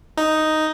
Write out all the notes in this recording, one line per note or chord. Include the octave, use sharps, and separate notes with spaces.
D#4